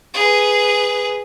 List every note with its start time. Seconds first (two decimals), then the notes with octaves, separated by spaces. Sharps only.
0.14 G#4 B4